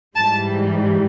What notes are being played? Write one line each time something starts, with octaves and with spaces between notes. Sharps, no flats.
G#2 E3 G3 A5